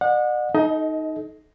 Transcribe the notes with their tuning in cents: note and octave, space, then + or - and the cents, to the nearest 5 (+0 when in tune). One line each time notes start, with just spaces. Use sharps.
D5 +45 F#5 -30
D#4 +0 A4 -35 D#5 +25